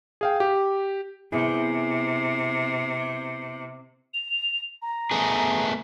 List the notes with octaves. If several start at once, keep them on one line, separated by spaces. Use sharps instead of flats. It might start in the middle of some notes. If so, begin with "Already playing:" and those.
G#4 F5 G5
G4
C3 B3 E4 G#4
F7
A#5
A3 B3 G#4